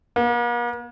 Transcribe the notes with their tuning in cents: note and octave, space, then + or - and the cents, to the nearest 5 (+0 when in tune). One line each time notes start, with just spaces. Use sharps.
A#3 +45